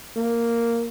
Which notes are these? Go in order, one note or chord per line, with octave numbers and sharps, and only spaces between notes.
A#3